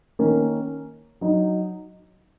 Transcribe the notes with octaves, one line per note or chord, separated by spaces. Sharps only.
D#3 A#3 C#4
F#3 D#4